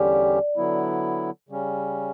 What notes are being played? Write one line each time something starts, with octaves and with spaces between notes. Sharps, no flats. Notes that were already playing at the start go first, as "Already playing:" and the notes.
Already playing: E2 D3 G3 C#4 G4 D5
D3 F#3 B3 E4
C#3 G3 C#4